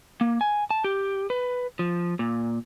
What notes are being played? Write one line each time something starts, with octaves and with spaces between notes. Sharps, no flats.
A#3
G#5
A5
G4
B4
F3
A#2